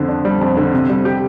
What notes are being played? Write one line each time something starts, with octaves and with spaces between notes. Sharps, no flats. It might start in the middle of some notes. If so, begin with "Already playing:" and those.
Already playing: F2 D3
D4
G3
F2
D3
C3
G3
G4